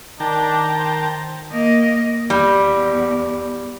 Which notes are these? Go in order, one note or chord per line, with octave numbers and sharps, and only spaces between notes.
D#3 D4 G5 A5 A#5
C5
A#3 D#5
E2 G3